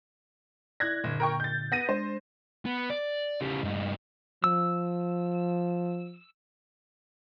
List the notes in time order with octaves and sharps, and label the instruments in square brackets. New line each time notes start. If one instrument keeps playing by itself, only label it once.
[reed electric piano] E4 D5 [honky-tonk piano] F#6 G#6 A#6
[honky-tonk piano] F#1 [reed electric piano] A#2 D3
[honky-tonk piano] A#4 G5 C#6
G6 A6
B3 A#6 D#7
[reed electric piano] G#3 D4 [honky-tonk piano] C5
[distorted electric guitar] B3
D5
C#3 G3
G2 D#4
[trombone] F3 [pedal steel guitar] E6